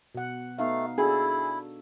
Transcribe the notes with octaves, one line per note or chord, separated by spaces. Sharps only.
B2 F#5
A3 B3 D#4 F5
D4 E4 F#4 G#4 A4